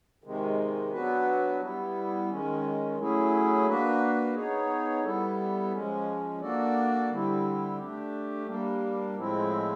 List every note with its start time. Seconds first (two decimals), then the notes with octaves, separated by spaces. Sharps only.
0.24 C3 D#3 G#3
0.91 F#3 B3 D4 F#4 B4
1.61 G3 B3 E4
2.29 D#3 G#3 C#4
2.98 F#3 A3 C#4 E4 G#4
3.66 A#3 D4 F#4 B4
4.35 B3 D#4 G#4 C#5
5.03 G3 B3 E4 A4
5.72 F3 G#3 C#4
6.41 A#3 D4 F#4 A4 D5
7.10 D3 G3 C4 E4
7.78 A3 D4 G4
8.46 G3 A#3 D4
9.16 A2 F3 G#3 C4 E4